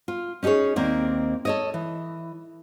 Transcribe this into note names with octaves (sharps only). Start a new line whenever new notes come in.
F4
C#4 D#4 G4 G#4 C#5
D#2 A#3 C4 A#4 D5
A4 C#5 D#5
E3